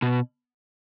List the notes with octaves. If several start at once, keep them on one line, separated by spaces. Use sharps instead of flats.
B2